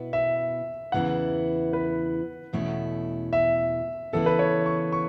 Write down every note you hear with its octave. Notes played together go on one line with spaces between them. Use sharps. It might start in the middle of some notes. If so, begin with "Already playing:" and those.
Already playing: B2 B3 E4
E5
E2 C#3 E3 B3 E4 F#5
B4
E2 B2 A3 C#4 E4
E5
C#3 E3 B3 E4 A4
B4
C#5
C#6
C#6